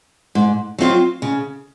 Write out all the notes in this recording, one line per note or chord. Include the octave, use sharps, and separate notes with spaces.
G#2
F#3 C4 F4
C#3